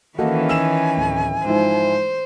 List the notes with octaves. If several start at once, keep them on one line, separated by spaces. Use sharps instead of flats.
D#3 E3 A#3 C#4 F#4 A4 D#5
G#5 E6 E7
D1
G#2 F3 E4 C5